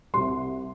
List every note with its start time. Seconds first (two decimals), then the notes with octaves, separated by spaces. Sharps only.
0.14 C2 C3 G3 C6